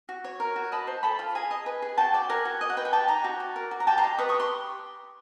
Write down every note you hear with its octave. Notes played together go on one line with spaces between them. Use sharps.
F#4
C#5
A#4
F#4
D#5 A5 B5
C5
A4 A5 B5
F4
G#4 G#5 A#5
D#5
B4
G#4
F#4 G5 A5
D5 G5 A5
A#4 F#5 G#5
F#4
D#5
F#5
B4 G5
G#5
G4 G5 A5
D#4 G#5 A#5
F#4
D5
A#4
F#4
A#5
G4 G5 A5
A#5 C6
D#5
B4 C#6 D#6
C#6 D#6
G4
C6